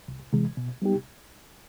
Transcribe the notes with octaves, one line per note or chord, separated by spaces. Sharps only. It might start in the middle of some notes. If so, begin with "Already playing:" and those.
C2
C3 E3 G#3
B2
G3 B3 D#4 G4